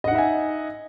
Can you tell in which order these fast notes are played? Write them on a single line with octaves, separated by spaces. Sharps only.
D#5 F#5 D#4 E5 G#5